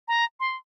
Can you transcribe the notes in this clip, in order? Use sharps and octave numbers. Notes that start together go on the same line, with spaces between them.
A#5
C6